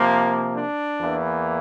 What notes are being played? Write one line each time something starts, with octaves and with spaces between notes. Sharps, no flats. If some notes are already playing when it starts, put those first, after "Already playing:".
Already playing: C3 F3 A#3
D4
E2 E3 A#3